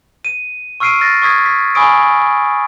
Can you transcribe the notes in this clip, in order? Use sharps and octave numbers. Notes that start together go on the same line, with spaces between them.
D#7
C#6 E6 F6 C7 D7 D#7
F6 A6 A#6
C#6 D#6 G#6 B6
B6
G#5 B5 C#6 D#6 E6 D7